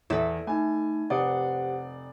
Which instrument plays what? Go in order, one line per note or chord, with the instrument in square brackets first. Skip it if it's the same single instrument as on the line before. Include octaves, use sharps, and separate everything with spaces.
[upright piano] E2 [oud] E4 A4
[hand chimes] A3 D#4 [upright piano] G#5
[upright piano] F1 D5 D#6 [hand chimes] G4 C5 F#5